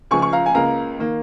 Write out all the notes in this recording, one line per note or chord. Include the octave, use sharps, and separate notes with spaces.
C#2 C#3 F3 G#5 C#6
C#6
F5 A#5
G#5
C#2 C#3 A#3 F5 A#5
D#3 A#3